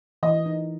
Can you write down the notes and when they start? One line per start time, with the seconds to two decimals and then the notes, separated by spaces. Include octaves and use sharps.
0.23 E3 D#5
0.46 D#4